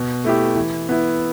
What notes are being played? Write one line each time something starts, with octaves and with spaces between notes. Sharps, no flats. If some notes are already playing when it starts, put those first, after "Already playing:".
Already playing: B2
A3 E4 G4
E3
B3 E4